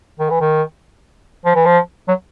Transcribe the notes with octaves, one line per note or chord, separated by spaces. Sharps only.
D#3
E3
D#3
F3
E3
F3
F#3